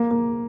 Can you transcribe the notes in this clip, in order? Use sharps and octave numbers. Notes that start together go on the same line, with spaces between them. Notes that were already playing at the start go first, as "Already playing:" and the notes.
Already playing: A#3
A#3